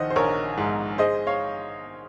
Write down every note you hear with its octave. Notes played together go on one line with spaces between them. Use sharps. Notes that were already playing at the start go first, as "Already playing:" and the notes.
Already playing: A#1 D#3 C5 D#5 F#5
C5
A#1 A#4 C#5
G#2
G#3 C5 D#5
C#5 F5